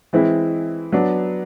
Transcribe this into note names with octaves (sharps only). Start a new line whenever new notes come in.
E3 G#3 C4 E4
F#3 B3 D4